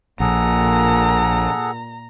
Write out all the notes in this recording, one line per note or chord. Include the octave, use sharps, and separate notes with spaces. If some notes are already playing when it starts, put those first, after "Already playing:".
A#1 A#2 G#4 A4 F#5 A#5